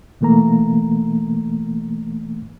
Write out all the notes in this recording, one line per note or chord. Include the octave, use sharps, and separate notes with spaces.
B2 E3 A3 A#3 A#5